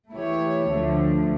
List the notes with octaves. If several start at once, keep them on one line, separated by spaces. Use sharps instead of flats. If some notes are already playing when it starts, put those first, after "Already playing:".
E3 A3 E4 G4 C#5
D2 D3 F3 A3